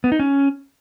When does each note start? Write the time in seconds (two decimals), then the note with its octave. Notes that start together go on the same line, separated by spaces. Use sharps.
0.04 B3
0.12 D#4
0.19 C#4